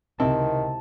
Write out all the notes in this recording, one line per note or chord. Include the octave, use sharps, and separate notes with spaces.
C#2 C3 D#3 C4 E4 A5